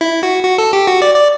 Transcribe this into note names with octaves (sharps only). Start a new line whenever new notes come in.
E4
F#4
F#4
A4
G4
F#4
D5
D5